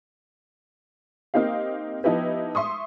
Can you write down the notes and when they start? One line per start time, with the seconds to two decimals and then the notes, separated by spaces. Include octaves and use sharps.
1.34 A#3 C4 D#4 G4 F5
2.04 F3 B3 D#4 E4 G4 B4
2.55 E5 C6 C#6 D#6